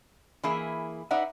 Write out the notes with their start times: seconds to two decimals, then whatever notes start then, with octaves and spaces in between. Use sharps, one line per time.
0.43 E3 A#3 E4 G#4
1.11 D#4 B4 D5 E5 F#5